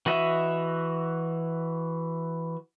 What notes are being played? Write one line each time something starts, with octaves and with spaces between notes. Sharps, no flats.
E3 F#4 D#5 E5